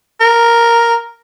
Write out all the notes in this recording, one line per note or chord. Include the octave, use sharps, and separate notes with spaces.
A#4